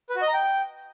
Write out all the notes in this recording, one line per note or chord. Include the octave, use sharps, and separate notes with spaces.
B4
F#4
D#5
A#5
G5